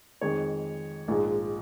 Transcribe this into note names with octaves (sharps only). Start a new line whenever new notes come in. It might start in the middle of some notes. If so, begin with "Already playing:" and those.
F2 D#3 G#3 C#5
A#1 G#2 F3 G#3